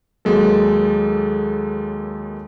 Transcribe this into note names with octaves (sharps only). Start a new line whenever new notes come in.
D#2 F#3 G#3 A#3 A4